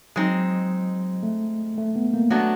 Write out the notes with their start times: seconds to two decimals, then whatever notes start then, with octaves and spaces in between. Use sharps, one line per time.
0.16 F#3 G#3 C4 D#4
1.23 A3
1.78 A3
1.96 B3
2.14 A#3
2.30 F#3 A3 B3 D4 F#4